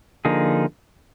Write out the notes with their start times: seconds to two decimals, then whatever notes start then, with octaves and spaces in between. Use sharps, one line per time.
0.25 D3 F3 A#3 D#4 G#4